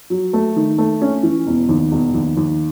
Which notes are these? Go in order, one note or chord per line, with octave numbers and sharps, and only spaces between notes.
F#3
A3
D#3
A3
C#4
E3
E1
D#2
E1
D#2
D#2